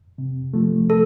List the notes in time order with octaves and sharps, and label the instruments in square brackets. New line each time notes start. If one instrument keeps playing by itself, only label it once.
[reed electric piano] C3
F3 A3
[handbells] A4